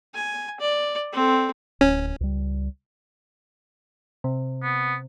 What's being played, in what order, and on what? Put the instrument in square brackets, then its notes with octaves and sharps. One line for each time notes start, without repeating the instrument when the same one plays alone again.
[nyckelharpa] G#5
D5
C4 A4
[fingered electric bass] D1 [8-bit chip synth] C#4
[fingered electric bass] C#2 G3
[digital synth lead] C3
[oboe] B3